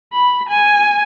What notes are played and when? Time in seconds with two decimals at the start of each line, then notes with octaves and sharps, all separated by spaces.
0.13 B5
0.49 G#5